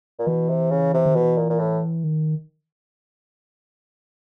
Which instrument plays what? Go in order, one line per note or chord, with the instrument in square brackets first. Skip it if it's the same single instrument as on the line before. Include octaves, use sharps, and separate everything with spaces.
[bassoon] A#2
[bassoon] B2 [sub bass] E3
[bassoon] C3
C#3
C3
[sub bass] D#3
[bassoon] B2 [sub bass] E3
[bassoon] A#2
A#2
A2
[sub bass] D#3